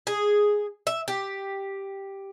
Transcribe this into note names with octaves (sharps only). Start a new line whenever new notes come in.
G#4
E5
G4